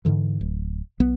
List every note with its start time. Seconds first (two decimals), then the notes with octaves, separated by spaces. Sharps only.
0.05 G#2 B2 D3 E3
0.41 D1
1.00 B1 B3